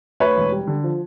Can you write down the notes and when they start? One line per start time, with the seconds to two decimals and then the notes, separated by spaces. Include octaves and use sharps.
0.20 D2 B4 C#5
0.37 E1
0.52 G3
0.67 D3
0.84 F3